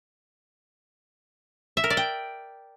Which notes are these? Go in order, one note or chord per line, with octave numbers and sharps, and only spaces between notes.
E5
A#4
D5
G5